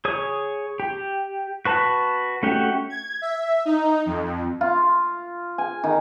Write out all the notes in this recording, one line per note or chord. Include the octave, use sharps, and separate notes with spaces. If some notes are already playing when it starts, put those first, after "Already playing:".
G#4 C#5 D#6
G4
F#4 B4 A5
A3 C#4 F#4 G4
G#6
E5
D#4
F2
F4
G#5
D#3